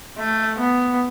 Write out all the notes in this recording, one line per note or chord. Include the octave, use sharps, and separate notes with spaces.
A3
B3